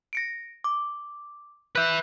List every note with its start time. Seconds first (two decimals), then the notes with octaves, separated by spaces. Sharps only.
0.13 A#6 C#7 D7
0.64 D6
1.75 B4 E5 F#6 G6